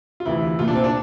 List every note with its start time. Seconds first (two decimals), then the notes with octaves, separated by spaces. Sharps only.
0.20 F4
0.25 D2 C3 E3 E4
0.59 C2 A#2 F4
0.68 D4
0.75 C4
0.84 D4